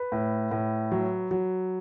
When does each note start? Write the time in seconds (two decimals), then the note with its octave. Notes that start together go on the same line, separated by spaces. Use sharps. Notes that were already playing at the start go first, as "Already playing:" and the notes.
Already playing: B4
0.12 A2
0.51 A2
0.92 F#3
1.31 F#3